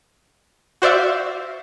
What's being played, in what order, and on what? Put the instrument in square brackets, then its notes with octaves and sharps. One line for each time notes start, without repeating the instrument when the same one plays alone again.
[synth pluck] F#4 C5 D5 E5 F5